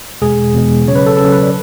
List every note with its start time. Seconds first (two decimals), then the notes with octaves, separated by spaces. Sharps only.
0.22 E2 B2 G#3 G#4
0.54 E2 B2 G#3
0.85 C#3 F#3 C#4 C#5
0.95 B4
1.06 A4
1.17 C#3 F#3 C#4 A4
1.32 B4
1.42 D5